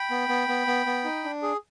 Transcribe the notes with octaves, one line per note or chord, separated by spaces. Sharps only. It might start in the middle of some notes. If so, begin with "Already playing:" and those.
Already playing: G5 B5
B3
B3
B3
B3
B3
D#4
D4
G#4